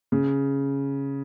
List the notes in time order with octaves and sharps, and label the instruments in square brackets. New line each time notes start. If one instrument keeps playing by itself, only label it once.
[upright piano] C#3